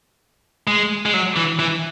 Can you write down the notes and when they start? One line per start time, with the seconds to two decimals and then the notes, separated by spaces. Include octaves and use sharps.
0.67 G#3
1.06 G#3
1.14 F#3
1.36 E3
1.59 E3